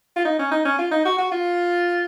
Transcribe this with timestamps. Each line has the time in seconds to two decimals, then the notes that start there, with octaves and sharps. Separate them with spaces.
0.16 F4
0.25 D#4
0.39 C#4
0.51 D#4
0.65 C#4
0.79 F4
0.91 D#4
1.05 F#4
1.18 F#4
1.32 F4